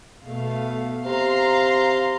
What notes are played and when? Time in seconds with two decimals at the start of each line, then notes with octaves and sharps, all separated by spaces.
0.24 B2 A3 F5
1.05 C3 F5 A#5 C6